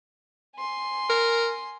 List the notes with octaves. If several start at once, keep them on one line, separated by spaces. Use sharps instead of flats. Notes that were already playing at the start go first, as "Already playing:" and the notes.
G#5 C6
A#4